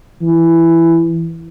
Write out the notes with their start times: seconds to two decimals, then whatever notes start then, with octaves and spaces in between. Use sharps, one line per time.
0.22 E3